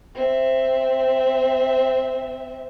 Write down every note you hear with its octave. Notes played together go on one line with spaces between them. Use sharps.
C4 E5